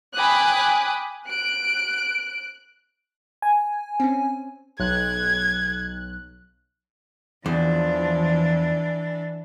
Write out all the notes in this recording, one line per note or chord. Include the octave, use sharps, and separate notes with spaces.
G5 G#5 B5 D6 D#6 F#6
F#6 D7
G#5
C4 C#4
B1 F#6 G#6
E2 E3 F3 D4